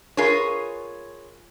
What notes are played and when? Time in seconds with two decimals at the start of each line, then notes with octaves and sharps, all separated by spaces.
0.17 F4 G#4 A#4 B4 C#5